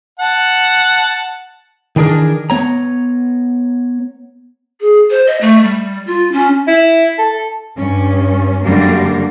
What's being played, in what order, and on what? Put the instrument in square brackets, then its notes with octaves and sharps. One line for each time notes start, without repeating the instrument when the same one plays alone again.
[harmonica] F#5 A5
[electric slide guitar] D#3 E3 D4 G#4 A#4
B3 C#5 A#5
[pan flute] G#4
C5
D#5
A3
G3
F4
C#4
[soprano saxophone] E4
A4
[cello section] G2 C#4
F#2 D3 G3 A#3